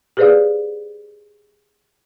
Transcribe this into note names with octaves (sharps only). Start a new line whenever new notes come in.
G4 G#4 B4 C5 D5 F5